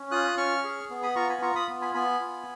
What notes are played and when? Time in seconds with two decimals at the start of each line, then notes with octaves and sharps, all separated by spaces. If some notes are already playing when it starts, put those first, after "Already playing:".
Already playing: C#4
0.11 F4 D#6 F#6
0.37 C#4 C#6 F6
0.64 G#4
0.90 B3
1.03 B5 D#6
1.16 F4 A#5 C#6
1.29 G#5 B5
1.42 F4 A#5 C#6
1.55 B5 D#6
1.68 B3
1.81 G#5 B5
1.94 B3 G#5 B5
2.21 F4